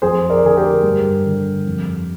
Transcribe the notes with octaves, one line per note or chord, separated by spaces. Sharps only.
F2 G#4 C5
A#4 D5
D3 G#4
G4 A#4
G2
D3
F2